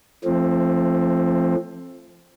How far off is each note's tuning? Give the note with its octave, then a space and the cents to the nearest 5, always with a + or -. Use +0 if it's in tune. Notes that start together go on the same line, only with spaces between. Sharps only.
F3 -25 A3 +0 C4 +15